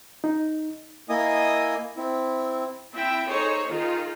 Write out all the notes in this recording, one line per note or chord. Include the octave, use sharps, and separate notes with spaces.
D#4
A#3 E4 D#5 G#5 D#6
C4 E4
C4 E4 E5 G5
D#4 G#4 A4 C5 C#5
D#3 D#4 F4 G#4